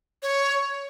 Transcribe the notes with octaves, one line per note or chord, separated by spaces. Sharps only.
C#5